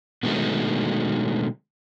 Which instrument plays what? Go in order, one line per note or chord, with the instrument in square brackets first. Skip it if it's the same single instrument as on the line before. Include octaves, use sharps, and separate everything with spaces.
[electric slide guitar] B2 D3 D#3 F#3 G#3 A3